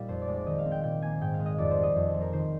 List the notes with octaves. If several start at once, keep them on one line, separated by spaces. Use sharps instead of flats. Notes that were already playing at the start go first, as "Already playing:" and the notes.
Already playing: A#2 G3 D#4 F5
F2 C5
D5
G#3
D5
D#3 D#5
F5
C4
G5
A#2 G5
A#3 G#5
G#2 G5
F5
G#3
D#5
F2 D5
C5
G3
D#5
F2
C5
F3
A#4
D#3 C5